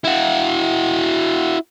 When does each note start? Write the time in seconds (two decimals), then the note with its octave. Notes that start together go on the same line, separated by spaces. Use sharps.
0.04 E4 F#4